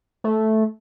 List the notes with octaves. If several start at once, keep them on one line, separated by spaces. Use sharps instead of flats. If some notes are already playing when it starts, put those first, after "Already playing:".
A3